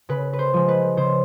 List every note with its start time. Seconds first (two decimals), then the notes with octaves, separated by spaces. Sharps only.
0.09 C#3 B4
0.33 B4
0.39 C5
0.54 F3 G#3
0.68 B4
0.97 C#3 C5